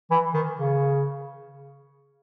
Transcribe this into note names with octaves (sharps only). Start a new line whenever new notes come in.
E3
D#3
C#3